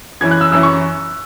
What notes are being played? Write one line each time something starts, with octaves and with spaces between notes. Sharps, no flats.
F#2 E3 C#4 E4 G#6
F#6
E6
F#2 E3 C#4 E4 E6
C#6